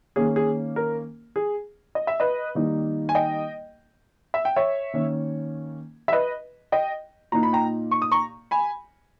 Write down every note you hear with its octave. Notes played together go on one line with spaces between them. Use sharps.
D#3 A#3 C#4 G#4
G#4
A#4
G#4
D#5
E5
B4 D#5
D#3 G3 A#3 D#4
G#5
D#5 G5
E5
G5
C#5 E5
D#3 A#3 C#4
E5
B4 D#5
D#5 G5
A#2 A#3 D#4 A#5
B5
G5 A#5
C#6
D#6
A#5 C#6
G#5 B5